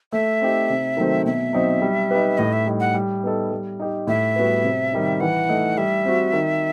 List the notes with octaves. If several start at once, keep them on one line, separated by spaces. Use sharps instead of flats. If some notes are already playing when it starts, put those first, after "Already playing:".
A3 E5
C4 D#4 G4
C3
D#3 F#3 A3 C4
B2 E5
F#3 C4 D#4
G3
D#4 G4 B4
A2 D#5
E5
G3 D#4
F#5
G3
B3 D#4 A4
G3
D#4 G4
A2 E5
G3 B3 F#4 B4
C3
D#3 G3 D#4
E3 F#5
A3 D#4
G3 E5
C4 F#4
D#3